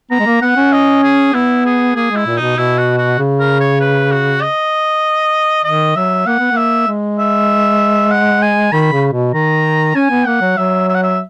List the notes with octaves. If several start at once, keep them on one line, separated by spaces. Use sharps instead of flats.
B3 A#5
G#3
A#3
B3 F#5
C#4
D#5
G#4
B3 E4
G#4
A#3 G#4
G#3 E4
A#2
B2 D#4
B2 E4
F#4
F#4
C#3
A#4
C#5
B4
F#4
D#5
D#3 D#5
F#3 E5
A#3 F#5
B3
A#3
E5
G#3
E5
F#5
G#5
D#3 B5
C#3
B2
D#3 A#5
C#4 G#5
B3
A#3 F#5
F#3
F#3 E5
E5
F#5
E5